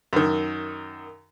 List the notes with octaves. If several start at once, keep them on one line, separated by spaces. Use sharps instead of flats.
F#2 D#3